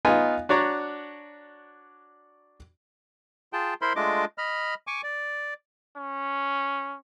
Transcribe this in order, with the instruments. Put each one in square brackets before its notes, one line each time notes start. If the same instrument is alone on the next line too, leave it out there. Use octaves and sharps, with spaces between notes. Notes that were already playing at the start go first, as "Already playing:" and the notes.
[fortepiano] B3 D#4 F4 G#5
D4 F#4 C#5 D5 A#5
[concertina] F4 G#4 G5 A5
E4 A#4 C5 B5 C6
G#3 A3 D4 F4 D#5 D6
D#5 B5 F6
G#5 C#6 D6
D5
[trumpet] C#4